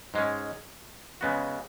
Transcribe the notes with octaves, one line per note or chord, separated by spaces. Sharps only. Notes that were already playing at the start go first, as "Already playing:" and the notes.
G#2 G#3 C#4
C#3 G#3 B3 F#4